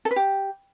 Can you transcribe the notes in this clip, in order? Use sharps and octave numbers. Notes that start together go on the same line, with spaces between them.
A4
B4
G4